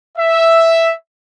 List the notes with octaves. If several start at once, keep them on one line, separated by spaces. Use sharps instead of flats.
E5